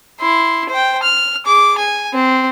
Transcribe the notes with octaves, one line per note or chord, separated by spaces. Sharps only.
E4 C6
C5 G5
F6
G#4 D6
G#5
C4